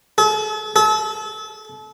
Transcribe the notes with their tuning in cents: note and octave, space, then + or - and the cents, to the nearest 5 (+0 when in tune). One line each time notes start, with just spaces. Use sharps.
A4 -45
A4 -35